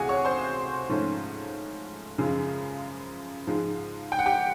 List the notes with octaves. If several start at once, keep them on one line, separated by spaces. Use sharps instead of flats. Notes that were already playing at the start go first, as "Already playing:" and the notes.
Already playing: C#2 C3 E3 A3 F#4 G#4 F#5 G#5
C#5 C#6
C5 C6
G#2 F3 A3 C#4
F#2 C#3 F3 G#3
G#2 F3 G#3
G5
F#5
G4 G5